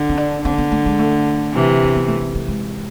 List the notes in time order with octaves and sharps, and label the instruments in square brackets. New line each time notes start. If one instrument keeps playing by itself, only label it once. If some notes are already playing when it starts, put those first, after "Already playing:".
Already playing: [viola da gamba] D3
[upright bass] C4
D4
[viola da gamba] D3 [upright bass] C4
[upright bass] B3
A3
G#3
A3
[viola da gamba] C3 E3
[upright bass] C4
B3
A3
B3
A3
G#3